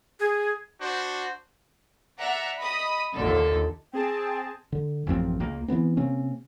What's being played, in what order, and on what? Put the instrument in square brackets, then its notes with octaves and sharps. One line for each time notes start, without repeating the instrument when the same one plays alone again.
[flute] G#4
[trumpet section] D4 F#4 C5
[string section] D5 E5 F#5 A#5
D#5 B5 D#6
D#2 A#2 D3 A4
[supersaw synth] C4 G#4 A5 [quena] G5
[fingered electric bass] D3
A1 F#2 F3 C4
C#2 A#3
E3 F#3 B3 C4
C3 A#3 C4 C#4